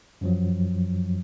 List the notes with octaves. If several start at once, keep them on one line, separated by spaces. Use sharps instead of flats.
F#2 F3 F#3